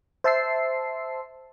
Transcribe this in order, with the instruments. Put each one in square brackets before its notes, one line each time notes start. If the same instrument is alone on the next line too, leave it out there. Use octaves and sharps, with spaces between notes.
[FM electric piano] C5 E5 A5 C6 E6 C7